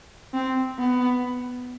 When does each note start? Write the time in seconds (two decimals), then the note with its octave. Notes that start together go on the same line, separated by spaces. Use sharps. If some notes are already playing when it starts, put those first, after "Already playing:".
0.34 C4
0.79 B3